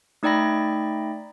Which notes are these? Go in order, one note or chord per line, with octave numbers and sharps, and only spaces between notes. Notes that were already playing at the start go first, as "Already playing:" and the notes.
A3 D#4 D5 G5 B5 A#6